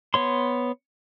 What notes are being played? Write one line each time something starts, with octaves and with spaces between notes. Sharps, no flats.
B3 C#5 C6